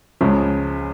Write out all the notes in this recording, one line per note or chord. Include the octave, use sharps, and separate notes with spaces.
C#2 C#3 F3 G#3